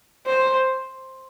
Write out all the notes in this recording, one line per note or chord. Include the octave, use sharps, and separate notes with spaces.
C5